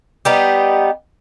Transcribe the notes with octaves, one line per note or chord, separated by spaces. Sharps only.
G3 B3 D#4 G4